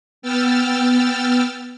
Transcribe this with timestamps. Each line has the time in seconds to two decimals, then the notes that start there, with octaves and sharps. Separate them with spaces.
0.22 B3 G5 E6 F6 A6